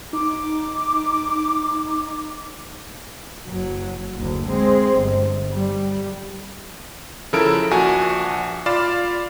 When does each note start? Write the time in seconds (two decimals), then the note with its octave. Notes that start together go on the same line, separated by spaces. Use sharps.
0.13 D#4 D6
3.48 F#1 F#3
4.16 F#1 D2
4.49 G#3 C4
4.99 G1
5.53 G3
7.33 C#3 F3 E4 A4 A#4 D7
7.71 A#1 A#2 F#4 G#5 A5
8.66 F4 D5 F5 B5 F6 E7